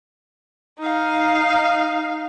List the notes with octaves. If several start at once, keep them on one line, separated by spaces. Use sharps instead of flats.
D#4 F5